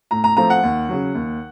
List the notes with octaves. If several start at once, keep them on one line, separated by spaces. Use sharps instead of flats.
A2 A#5
A#5
F3 A3 C4 A#5
F#5
D#2
C#3 F#3
D#2